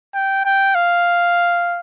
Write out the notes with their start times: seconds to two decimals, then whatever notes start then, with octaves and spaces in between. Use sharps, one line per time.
0.15 G5
0.46 G5
0.75 F5